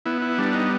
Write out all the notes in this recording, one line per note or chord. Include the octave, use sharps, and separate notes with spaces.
B3 E4
E4
G3 D4
D#4